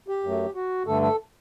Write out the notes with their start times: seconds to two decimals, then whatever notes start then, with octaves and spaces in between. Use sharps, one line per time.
0.08 G4
0.23 F#2 F#3 A3
0.55 F#4
0.86 G2 D3 A3 A4
1.02 A4